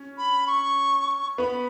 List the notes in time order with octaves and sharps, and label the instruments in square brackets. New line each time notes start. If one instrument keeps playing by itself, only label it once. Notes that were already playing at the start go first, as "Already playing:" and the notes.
Already playing: [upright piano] C#4
[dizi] B5
C#6
[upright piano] B3 [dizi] B5